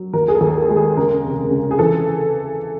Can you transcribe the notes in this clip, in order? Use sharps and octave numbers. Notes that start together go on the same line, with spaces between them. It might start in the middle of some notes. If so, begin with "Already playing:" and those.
Already playing: F#3
D#2 A#4
G#4
A4
D#2
G#3
G#4
C#3 A#4
F1
C#3
G#4
E3 A4